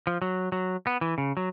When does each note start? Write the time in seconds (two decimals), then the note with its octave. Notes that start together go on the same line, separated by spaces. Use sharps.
0.07 F3
0.22 F#3
0.52 F#3
0.87 B3
1.01 E3
1.18 C#3
1.37 F#3